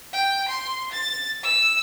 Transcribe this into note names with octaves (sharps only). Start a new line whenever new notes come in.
G5
C6
A6
E6